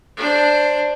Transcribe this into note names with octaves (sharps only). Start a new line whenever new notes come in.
D4 C5